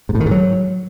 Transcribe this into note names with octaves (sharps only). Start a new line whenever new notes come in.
G#2
A2
D#3
G#2
F#3